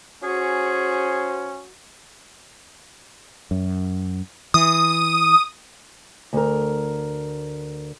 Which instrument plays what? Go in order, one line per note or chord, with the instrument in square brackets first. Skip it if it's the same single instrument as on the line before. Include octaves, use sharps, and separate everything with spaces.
[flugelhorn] C#4 [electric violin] F#4 [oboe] G#4 [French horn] C5
[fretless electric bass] F#2
[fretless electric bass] E3 [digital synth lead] D#6
[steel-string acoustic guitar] D2 A#4